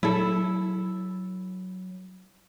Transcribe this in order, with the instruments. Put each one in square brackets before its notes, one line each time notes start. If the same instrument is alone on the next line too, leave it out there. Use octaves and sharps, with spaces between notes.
[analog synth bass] F#3 [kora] E4 A4